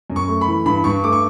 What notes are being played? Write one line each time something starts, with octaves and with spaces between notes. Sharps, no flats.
F#2
C#6
A3
B5
E3
G2 B5
G2 C#6
A3 D6
C#6